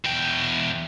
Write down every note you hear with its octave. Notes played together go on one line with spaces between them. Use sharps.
E2 G5